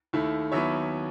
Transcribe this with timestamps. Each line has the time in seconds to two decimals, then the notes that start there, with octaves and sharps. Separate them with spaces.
0.13 D#2 D#3 A3 E4
0.52 D#2 D#3 F#3 B3 E4 C#5 E5